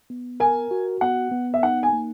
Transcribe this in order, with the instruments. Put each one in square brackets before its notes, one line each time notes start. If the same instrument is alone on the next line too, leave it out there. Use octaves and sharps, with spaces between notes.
[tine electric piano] B3
[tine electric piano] A#4 [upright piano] G#5
[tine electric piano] F#4
[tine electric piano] B3 [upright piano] F#5
[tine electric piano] B3
[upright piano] E5
[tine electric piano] D#4 [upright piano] F#5
[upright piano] G#5
[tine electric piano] A#3